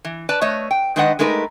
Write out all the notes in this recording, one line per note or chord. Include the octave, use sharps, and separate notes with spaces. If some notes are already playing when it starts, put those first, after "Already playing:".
E3
B4 D5 A5
A3 C#5 D#5
G5
D#3 G#3 D4 B4 D#5 F#5
G#3 A3 D#4 A#4 B4